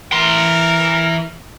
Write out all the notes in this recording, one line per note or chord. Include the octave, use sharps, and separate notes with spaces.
E3 A#4 C6